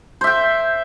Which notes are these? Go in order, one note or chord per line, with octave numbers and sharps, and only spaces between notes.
C5 E5 G5